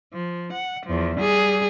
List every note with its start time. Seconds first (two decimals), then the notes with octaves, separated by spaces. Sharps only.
0.14 F3
0.53 F#5
0.86 E2 F3
1.17 G3 G#4